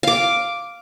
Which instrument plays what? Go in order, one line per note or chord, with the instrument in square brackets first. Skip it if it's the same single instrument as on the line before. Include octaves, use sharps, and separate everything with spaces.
[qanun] F5 D6